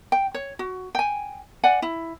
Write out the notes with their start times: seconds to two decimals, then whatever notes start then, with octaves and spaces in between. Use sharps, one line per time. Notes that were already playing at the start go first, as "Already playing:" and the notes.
0.12 G5
0.34 C#5
0.59 F#4
0.95 G5 G#5
1.63 D5 F#5 G#5
1.82 E4